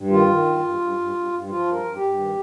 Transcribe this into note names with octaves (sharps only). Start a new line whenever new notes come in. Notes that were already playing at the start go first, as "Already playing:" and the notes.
Already playing: G2
D#3 F4
D#3
G2
G2
G2
G2
G2
G2
F3 F4
G2
A#4
G2
G4
G2
D#3